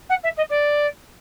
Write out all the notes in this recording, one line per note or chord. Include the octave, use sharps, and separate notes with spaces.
F#5
E5
D#5
D5